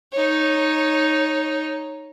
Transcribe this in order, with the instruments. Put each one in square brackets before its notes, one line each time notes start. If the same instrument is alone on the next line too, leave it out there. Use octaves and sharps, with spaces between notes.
[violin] D#4 C#5